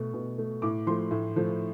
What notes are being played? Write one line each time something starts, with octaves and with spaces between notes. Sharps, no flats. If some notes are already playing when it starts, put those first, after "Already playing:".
Already playing: B2 A3
B2
A3
A2 D6
F3 A3 C6
A2
F3 A3